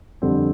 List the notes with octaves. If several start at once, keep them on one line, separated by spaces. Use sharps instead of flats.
F2 D3 G3 C4